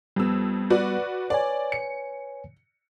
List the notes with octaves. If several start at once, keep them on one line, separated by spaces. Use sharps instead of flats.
F2 G3 B3 E6
F#4 B4 D5
B4 C#5 D5 G#5
C#7